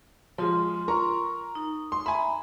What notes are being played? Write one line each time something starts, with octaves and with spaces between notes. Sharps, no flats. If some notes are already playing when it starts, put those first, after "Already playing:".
F3 G#3 F4 C6
A#4 A#5 C#6
D#4
C6
E5 G#5 A#5 B5